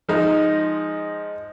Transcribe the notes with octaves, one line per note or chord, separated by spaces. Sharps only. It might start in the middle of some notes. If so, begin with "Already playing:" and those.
F3 G#3 D#4